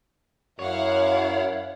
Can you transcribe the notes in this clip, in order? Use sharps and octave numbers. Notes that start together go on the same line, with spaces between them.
F#2 E4 C#5 F5 F#5